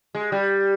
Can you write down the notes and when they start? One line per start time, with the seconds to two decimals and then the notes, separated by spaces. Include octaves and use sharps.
0.15 G#3
0.32 G3